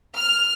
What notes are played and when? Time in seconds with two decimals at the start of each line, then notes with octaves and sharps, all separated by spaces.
0.16 F6